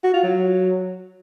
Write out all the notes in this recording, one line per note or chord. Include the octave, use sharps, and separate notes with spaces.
F#4
F4
F#3